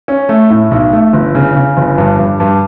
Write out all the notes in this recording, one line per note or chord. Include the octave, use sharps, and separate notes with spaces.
C#4
A3
A2
B1
A3
G1
C#3
C#3
G1
G2
G2
G2